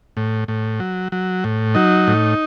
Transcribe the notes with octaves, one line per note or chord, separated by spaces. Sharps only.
A2
A2
F#3
F#3
A2
F#3 D#4
A2